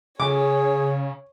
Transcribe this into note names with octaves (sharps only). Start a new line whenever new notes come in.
C#3 G#4 C#5 D6